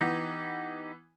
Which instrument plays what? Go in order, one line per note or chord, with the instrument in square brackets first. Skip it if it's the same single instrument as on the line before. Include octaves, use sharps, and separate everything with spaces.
[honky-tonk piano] E3 B3 [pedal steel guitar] D#4 G4